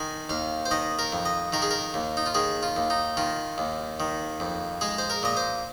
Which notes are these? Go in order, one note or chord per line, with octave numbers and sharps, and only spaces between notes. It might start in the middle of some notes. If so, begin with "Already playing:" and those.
Already playing: D#3 G#5
D#2 F5
C5
D#3 D#5
A#4
F2
D#5
D#3 A#4
G#4
A#4
D#2
D#4
F4
D#3 G#4
F4
D#2
D#4
D#3 F4
D#2
D#3
F2
G#3 G#4
C5
A#4
A#2 D#5
C5